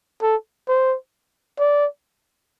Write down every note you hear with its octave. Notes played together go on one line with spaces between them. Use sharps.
A4
C5
D5